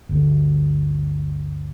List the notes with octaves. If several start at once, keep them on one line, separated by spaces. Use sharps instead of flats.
G1 D2